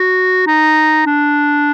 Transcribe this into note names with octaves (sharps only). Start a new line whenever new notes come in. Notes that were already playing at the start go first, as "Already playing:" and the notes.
Already playing: F#4
D#4
D4